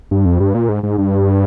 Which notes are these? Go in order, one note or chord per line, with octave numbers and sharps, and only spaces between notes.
G2
F2
G2
A#2
G#2
G#2
G2